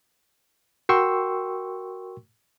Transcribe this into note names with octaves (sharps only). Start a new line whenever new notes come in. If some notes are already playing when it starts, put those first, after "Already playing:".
F#4 A#4 G5 C6 C#6 E6